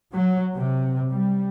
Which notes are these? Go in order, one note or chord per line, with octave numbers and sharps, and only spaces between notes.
F#3
C3
G3